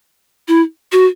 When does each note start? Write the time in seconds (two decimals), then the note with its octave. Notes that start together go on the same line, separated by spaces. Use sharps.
0.48 E4
0.92 F#4